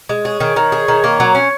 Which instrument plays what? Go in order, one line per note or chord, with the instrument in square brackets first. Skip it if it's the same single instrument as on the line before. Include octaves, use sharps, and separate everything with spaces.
[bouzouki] G#3
[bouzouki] G#4 [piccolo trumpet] C#5
[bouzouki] D#3
D#3
G#4
D#3
A#3
F#3
C#4